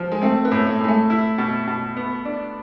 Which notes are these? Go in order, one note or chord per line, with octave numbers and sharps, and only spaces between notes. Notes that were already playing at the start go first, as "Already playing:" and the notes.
Already playing: F3
G#3
A3 C4
B3
A2
A3
A2 G#3
A3
E4
B2
B2
B3
D4